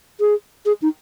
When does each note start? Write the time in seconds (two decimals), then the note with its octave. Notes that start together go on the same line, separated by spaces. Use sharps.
0.20 G#4
0.66 G#4
0.82 D#4